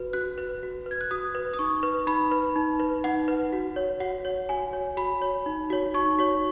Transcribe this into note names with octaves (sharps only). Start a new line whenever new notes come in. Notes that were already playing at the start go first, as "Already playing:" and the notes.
Already playing: F#4 B4
F#4 F#6
B4
F#4
B4 G#6
F#6
F#4 D#6
B4
D#6
D#4 C#6
B4
D#4 B5
B4
D#4
B4
D#4 F#5
B4
F#4
C#5
F#4 F#5
C#5
F#4 G#5
C#5
F#4 B5
C#5
D#4
F#4 C#5
D#4 C#6
F#4 C#5